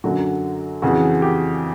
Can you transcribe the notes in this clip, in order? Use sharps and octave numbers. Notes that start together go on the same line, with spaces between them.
F#2 D3 F#3 F#4
F2 C#3 E3 F#4
G4